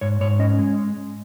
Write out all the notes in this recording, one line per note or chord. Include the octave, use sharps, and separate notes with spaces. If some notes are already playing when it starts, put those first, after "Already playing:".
G#2 C#5
G#2 C#5
C#4 D#5
G#3